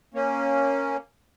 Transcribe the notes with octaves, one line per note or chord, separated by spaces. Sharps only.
A#3 C#4